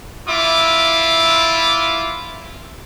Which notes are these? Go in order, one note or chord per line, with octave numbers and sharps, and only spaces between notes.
E4 F4 E5 D6